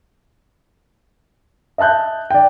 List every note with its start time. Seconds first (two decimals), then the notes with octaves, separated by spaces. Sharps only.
1.78 D#5 E5 A5 F#6 G6
2.30 D5 G5